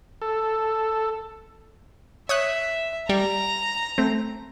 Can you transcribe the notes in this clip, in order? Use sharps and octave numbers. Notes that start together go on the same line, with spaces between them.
A4
C#5 E5 D#6 F#6
G3 A#5
A3 C4